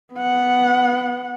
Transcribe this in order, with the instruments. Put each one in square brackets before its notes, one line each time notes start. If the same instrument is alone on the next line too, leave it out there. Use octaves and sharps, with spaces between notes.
[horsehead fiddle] B3 F#5